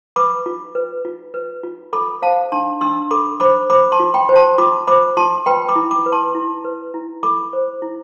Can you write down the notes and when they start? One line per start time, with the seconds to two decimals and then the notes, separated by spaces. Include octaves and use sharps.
0.16 B4 B5 D6
0.46 F4
0.75 B4
1.05 F4
1.34 B4
1.63 F4
1.93 A4 B5 D6
2.22 C5 F5 A5
2.52 D4 A5 C6
2.81 D4 C6 E6
3.11 A4 B5 D6
3.40 C5 B5 D6
3.70 C5 B5 D6
3.92 A5 C6
4.00 F4
4.14 G5 B5
4.29 C5
4.36 A5 C6
4.58 F4 B5 D6
4.87 C5 B5 D6
5.17 F4 A5 C6
5.46 B4 G5 B5
5.69 B5 D6
5.76 E4
5.91 B5 D6
6.06 B4
6.12 A5 C6
6.35 E4
6.65 B4
6.94 E4
7.23 A4 B5 D6
7.53 C5
7.82 E4